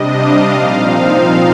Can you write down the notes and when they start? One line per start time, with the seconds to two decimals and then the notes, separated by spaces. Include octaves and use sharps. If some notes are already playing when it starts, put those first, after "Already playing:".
Already playing: C3 G3 D4 D#5
0.10 F5
0.52 A#2 F3 C4 D#4